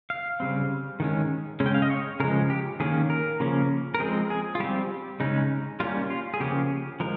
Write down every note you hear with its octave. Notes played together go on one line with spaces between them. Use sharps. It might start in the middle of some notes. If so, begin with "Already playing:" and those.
F5
C#3 G3 C4
D#3 G#3 C#4
C#3 G#3 C#4
G5
F5
D#5
C#5
C#3 F3 G#3 A#4
G4
D#3 A#3 C#4 G#4
A#4
C#3 F3 A#3 C#4
A#4
F3 G#3 C4 G#4
G#4
F4
G3 C4 G4
C#3 G#3 C#4 D#4
G3 A#3 C#4 F4
F4
G#4
C#3 F3 A#3 C#4 G4
F3 G#3 A#4